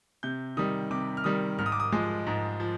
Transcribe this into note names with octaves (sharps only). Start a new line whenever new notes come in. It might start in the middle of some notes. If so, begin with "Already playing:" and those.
C3 G6
D#3 G3 D#6
C3 D6
F6
D#3 G3 D#6
G#2 F6
D#6
D6
D#6
F3 G#3
G#2
F3